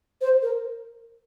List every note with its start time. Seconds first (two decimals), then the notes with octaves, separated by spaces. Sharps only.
0.21 C5
0.42 A#4